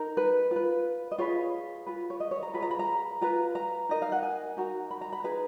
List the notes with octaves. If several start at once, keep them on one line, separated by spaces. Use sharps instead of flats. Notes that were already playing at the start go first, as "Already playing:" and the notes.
Already playing: D#4 A#4
B4
F4 B4
D#5
F4 G#4 B4 C#5
F4 G#4 B4
C#5
D#5
C#5
A#5
F4 G#4 B4 B5
A#5
B5
A#5
F4 B4 A#5
A#5
D#4 A#4 D#5
F5
F#5
G#5
D#4 F#4 A#4
B5
A#5
B5
D#4 G#4 B4 A#5